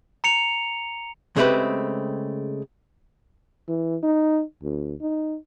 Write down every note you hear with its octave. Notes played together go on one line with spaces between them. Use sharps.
A#5 C#7 F7
C#3 G#3 A3 C4 G4 B4
E3
D#4
D2
D#4